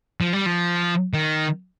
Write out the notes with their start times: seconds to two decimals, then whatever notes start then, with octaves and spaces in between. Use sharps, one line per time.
0.21 F3
0.33 G3
0.46 F3
1.14 D#3